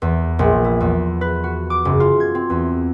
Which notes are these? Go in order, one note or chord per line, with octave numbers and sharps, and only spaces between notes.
E2
A#1
E4
E2
B4
F#4
D6
F#1
F4
G#6
C4
E2